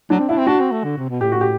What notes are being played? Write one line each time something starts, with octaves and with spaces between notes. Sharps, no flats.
F#3 D4
C4
D4 E4
C4
D4 F#4
C4
A3
D3
C3
B2
A2 G4
F#4
G4